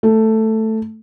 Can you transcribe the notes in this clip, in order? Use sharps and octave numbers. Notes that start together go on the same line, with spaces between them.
A3